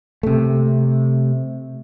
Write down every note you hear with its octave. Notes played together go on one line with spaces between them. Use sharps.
C3 A3